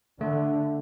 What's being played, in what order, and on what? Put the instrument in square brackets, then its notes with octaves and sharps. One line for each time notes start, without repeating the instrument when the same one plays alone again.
[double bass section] D3 [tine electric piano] A3